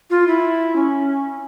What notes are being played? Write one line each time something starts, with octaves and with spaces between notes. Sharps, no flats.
F4
E4
C#4